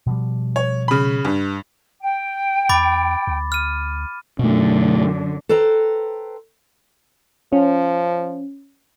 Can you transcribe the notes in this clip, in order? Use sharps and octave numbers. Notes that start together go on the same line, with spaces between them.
B2 F3 G3
C#5
C#3 B5
G2
G5
E2 B5 D6 A6
D2
F6 D#7
F#2 B2 D3 A3
A4 B4 C5 G5 A#5
F3 C#4